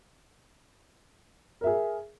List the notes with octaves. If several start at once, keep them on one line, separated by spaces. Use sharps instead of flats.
G#4 A#4 E5